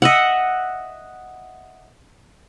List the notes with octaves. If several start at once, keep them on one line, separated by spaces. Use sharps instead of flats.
D#5 E5 F#5